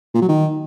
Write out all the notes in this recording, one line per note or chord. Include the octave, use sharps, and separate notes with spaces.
A#2
F#3
D#3